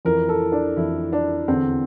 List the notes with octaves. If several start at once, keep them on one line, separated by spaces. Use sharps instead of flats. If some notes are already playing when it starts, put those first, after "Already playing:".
F2 E3 A#4
A4
D4
F2 E3 E4
D4
E2 D3 C4